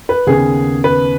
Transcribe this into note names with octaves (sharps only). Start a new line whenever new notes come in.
B4
D#2 C#3 B3 G#4
B4